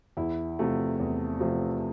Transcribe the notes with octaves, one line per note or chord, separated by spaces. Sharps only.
E2 E4
C3 F3 A3
E2
C3 F3 A3